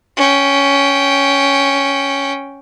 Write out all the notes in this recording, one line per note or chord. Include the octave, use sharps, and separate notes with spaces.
C#4 G5